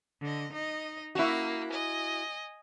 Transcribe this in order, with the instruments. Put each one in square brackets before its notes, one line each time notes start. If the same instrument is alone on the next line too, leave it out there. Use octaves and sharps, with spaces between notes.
[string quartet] D3 D#5
D#4 D#5
[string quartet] A#3 [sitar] E4 F#4
[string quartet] D#5 G#5